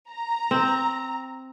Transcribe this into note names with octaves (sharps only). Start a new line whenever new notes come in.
A#5
C4